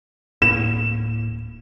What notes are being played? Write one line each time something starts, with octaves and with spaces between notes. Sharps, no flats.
D1 A2 A#3 E7